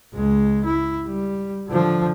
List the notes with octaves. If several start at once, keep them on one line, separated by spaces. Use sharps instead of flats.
C#2 G#3
E4
G3
D3 F3